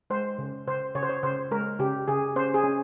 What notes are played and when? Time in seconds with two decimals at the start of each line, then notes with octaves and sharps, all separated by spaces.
0.10 G#3 C5
0.38 C#3
0.68 C#3 C5
0.95 C#3 C#5
1.03 C5
1.09 C#5
1.23 C#3 C5
1.51 G#3 A#4
1.79 C#3 G4
2.08 C#3 G#4
2.36 C#4 C5
2.54 G#4
2.64 C#4